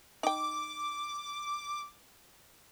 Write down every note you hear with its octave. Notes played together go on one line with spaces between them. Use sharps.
D#4 G5 D6